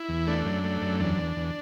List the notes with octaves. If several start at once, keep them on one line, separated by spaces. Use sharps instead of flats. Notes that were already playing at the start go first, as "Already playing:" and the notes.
Already playing: E4
E2
A3 D4
F#2
A3
F#2
E2 D4
E2
E2